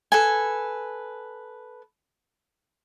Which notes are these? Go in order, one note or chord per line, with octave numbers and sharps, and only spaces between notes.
A4 B4 G#5